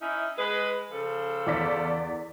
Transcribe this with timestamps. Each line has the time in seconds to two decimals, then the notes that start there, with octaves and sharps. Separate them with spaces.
0.01 C#4 D#4 E4
0.38 G#3 B4
0.92 C#3 F3 A4
1.47 E2 D5 B6